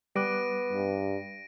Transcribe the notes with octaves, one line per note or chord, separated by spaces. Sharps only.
G3 B3 D6 F#6 A#6 D7 D#7
G2